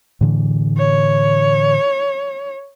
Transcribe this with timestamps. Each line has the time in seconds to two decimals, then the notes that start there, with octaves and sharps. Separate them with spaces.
0.21 A2 D3 E3
0.77 C#5